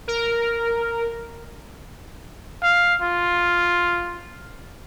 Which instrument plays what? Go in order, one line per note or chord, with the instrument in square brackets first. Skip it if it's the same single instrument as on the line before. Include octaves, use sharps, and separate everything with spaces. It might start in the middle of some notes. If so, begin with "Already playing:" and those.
[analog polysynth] A#4
[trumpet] F5
F4